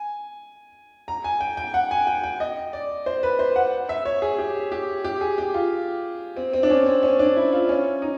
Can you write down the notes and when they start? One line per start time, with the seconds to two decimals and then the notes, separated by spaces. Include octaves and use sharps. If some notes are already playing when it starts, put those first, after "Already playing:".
Already playing: G#5
1.08 A#5
1.24 G#5
1.41 G5
1.57 G5
1.74 F#5
1.91 G#5
2.07 G5
2.23 G5
2.40 D#5
2.73 D5
3.06 C5
3.23 B4
3.39 C5
3.56 F#5
3.89 E5
4.05 C#5
4.22 G#4
4.38 G4
4.72 G4
5.04 G4
5.21 G#4
5.38 G4
5.54 F4
6.37 C4
6.53 C4
6.63 D4
6.70 C#4
6.86 C4
7.03 C#4
7.19 D4
7.36 E4
7.53 F4
7.69 C#4
8.02 D#4